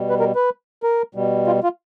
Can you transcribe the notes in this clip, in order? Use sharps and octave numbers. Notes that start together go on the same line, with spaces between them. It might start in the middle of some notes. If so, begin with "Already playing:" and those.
Already playing: B2 G3
B4
A#4
B4
A#4
B2 G3
F4
F4